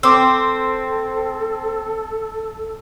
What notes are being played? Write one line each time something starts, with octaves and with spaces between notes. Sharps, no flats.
C4 A4 D6 E6